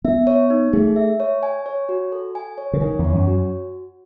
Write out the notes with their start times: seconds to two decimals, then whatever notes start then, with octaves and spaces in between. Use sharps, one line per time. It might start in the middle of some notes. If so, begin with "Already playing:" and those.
0.04 B3 E5
0.27 C#5
0.50 D#4
0.73 A3 G#4
0.96 E5
1.20 C#5
1.43 G#5
1.66 C#5
1.89 F#4
2.12 A4
2.35 G#5
2.58 C#5
2.73 C#3
2.81 D#3 G#5
2.99 E2
3.04 C#5
3.15 F#2
3.27 F#4